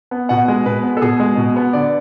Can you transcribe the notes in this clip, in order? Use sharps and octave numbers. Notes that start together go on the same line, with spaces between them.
B3
B2 F#5
G#3
B2 B4
B3
A4
B2 G#4
G#3
B2
B3
D3 D5